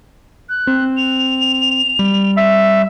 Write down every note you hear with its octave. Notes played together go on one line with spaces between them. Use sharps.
F#6
C4
F7
G3
E5